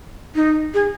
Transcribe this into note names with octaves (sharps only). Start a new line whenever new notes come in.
D#4
G#4